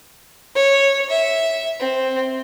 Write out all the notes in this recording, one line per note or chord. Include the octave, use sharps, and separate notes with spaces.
C#5
E5
C4